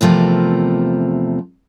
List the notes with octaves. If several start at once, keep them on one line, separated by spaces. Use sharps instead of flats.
E2 C3 F3 A3 A#4